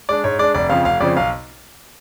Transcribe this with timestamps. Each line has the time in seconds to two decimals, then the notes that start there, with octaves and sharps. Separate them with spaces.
0.09 G#3 D4 D5
0.24 G#2 C#5
0.39 G#3 D4 D5
0.54 F1 D5
0.70 F2 C#3 F3 F5
0.85 F1 F5
1.00 F2 C#3 F3 D5
1.17 B1 F5